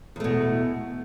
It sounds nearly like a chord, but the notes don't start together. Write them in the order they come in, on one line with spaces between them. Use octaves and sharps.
E2 A3 B2